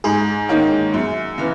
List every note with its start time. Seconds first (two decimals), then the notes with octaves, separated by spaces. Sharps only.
0.04 G#2 G#4
0.49 D#3 A#3 C#4
0.94 F#2
1.38 C#3 E3